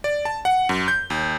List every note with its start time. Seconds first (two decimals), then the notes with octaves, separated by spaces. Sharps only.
0.04 D5
0.25 A5
0.45 F#5
0.69 F#2
0.88 G6
1.10 D#2